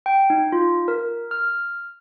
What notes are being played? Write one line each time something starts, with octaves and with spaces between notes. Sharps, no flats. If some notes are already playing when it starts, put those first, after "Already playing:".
G5
D#4
F4
A#4
F6